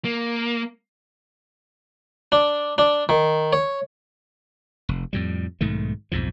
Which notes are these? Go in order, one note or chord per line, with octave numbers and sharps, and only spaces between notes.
A#3
D4
D4
D#3
C#5
F1
F2 A2 G3
B1 G#2 D#3 A3
B1 F2 G#2 F3